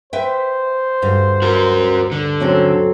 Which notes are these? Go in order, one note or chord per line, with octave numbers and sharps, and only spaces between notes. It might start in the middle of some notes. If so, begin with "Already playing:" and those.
B4 C5 E5 G5
D2 G2
F#4 A#4
D3
F#3 C4 C#4 A4